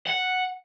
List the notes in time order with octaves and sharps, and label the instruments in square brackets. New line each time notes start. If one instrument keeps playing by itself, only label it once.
[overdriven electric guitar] F#5